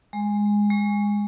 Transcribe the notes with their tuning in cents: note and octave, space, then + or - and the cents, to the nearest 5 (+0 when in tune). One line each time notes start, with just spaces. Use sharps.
G#3 -10
G#3 -15